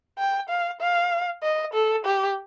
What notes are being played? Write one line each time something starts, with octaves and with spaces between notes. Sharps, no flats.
G5
F5
F5
D#5
A4
G4